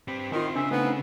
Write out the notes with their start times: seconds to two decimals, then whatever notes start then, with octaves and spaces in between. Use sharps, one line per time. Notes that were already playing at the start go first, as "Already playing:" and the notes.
0.08 C4 G4 B4
0.32 D#3 E4 F4 G5 C6
0.56 C#3 D4 E5
0.71 A3 B3 C4 D#4